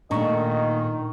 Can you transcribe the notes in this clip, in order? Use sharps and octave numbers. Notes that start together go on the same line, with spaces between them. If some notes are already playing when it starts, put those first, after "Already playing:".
A#2 D#3 A3 D4 D#5 A#5 C#6